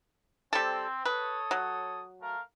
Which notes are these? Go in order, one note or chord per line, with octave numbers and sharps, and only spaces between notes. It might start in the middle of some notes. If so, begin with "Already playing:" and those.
G3 C4 A4
A4 B4 C#5 D#6
F#3
A3 A#4 F5